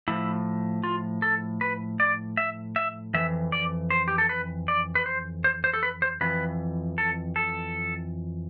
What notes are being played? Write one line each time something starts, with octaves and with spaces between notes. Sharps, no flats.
A2 F3 E4
F4
A4
B4
D5
E5
E5
F2 E3 E5
D5
C5
G4
A4
B4
D5
B4
C5
C5
C5
A4
B4
C5
F2 E3 B4
A4
A4